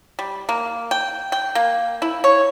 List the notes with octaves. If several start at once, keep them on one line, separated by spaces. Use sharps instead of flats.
G3
A#3
G5
G5
A#3
E4
C#5